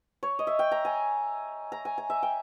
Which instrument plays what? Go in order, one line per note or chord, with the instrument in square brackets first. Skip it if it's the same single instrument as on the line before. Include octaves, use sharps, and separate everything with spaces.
[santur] C#5
D#5
E5
G5
A#5
G#5
A#5
G#5
G#5
E5
G5